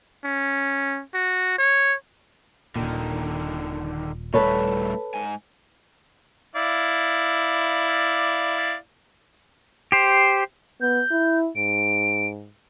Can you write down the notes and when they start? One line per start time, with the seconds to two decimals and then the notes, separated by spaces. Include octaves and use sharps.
0.24 C#4
1.14 F#4
1.58 C#5
2.76 D#1 A#2 D3 D#3
4.34 A2 G3 A3 A4 B4 C#5
5.14 G#2 G#5
6.56 E4 D5 F5
9.92 G4 C5
10.81 B3 G6
11.11 E4
11.56 G#2 D7